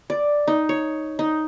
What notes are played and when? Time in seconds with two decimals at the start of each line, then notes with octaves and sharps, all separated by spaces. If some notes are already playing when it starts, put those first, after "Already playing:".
0.10 D5
0.48 D#4
0.69 C#5
1.19 D#4